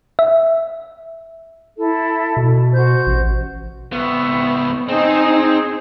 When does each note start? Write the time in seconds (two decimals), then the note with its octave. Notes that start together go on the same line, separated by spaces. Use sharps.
0.19 E5
1.77 E4 A4
2.37 B2
2.73 F#4 C5 G6
3.07 A1
3.93 C#2 B3 C4 E5 C#6
4.89 C4 D#4 G#4